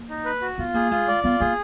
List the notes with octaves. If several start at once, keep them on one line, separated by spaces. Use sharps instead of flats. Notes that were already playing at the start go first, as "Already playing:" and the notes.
Already playing: A#3
D#4
B4
F#4
B3 F4
A#3 G#4
G#3 F4
D5
B3 F4
A#3 G#4